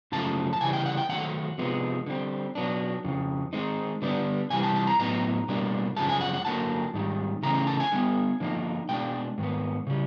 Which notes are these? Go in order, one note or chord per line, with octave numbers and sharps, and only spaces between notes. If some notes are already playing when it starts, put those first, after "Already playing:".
F#2 C#3 F3 A3 A5
A5
C#3 E3 G3 G#5
G5
F#5
G5
D#3 F#3 A3 F#5
C3 F3 G#3 B3
D3 G3 C4
B2 F#3 B3 D4
F2 C#3
D#3 G#3 C4 D#4
D3 G3 B3 D4
C3 E3 G3 G#5
A5
A5
A#5
A2 F#3 B3 D#4 A#5
B2 G3 A#3 D4
F#2 C#3 F3 G#3 A5
G#5
F#5
F#5
D3 F#3 A#3 A5
G#2 D#3 G3
C#3 E3 A3 C#4 A#5
A#5
A5
G#5
D3 G3 B3
D3 F3 A#3 D#4
B2 G#3 D4 G5
G#2 D#3 B3
C#3 G3